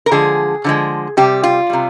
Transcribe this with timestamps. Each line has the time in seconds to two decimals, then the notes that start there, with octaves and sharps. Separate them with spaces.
0.06 A#4
0.11 D3 F3 G#3 G#4
0.65 D3 F3 G#3
1.17 C3 G3 G4
1.43 F4
1.70 C3 G3